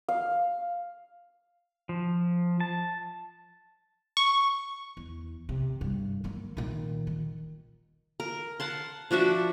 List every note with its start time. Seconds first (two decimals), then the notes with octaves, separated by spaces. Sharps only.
0.09 F5
1.89 F3
2.60 A5
4.17 C#6
4.97 E2
5.49 C3
5.81 G2
6.24 F#3 A#3
6.57 A#2 D#3
7.07 D#3
8.20 A#4
8.60 F#5 A5 C6
9.11 F3 D4 F#4 E5